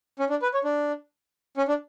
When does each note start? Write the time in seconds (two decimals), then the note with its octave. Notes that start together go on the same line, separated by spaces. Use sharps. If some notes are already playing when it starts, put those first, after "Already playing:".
0.19 C#4
0.30 D4
0.42 B4
0.54 C#5
0.64 D4
1.57 C#4
1.68 D4